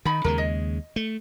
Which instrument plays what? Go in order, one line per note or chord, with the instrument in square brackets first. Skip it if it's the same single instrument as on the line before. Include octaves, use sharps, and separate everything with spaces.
[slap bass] D#3 [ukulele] D#4 B5
[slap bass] D#2 C#3 G#3 [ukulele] A#4
[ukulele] D#5
[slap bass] A3